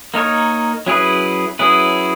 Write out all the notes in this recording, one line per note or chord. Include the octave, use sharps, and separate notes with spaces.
A#3 D#4 A#4 C#5
F#3 C#4 E4 G#4 B4
F#3 C#4 E4 G#4 B4